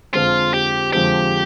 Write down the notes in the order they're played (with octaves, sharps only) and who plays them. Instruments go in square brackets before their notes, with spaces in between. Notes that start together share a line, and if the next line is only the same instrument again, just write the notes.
[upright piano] F2 D3 F3 G#3 C4 [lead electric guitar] F4
[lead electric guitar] G4
[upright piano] F2 D3 F3 G#3 C4 [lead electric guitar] G4